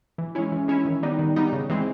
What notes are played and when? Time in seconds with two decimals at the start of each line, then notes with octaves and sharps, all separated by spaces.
0.18 E3
0.35 G#3 C#4 E4
0.52 E3
0.68 G#3 C#4 E4
0.85 D#3
1.03 G3 B3 D#4
1.19 D#3
1.36 G3 B3 D#4
1.53 C#3
1.70 E3 G#3 C4